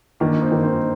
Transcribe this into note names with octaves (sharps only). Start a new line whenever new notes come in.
D#3 A#3 D4
C4 D#4
D#3
C4 D#4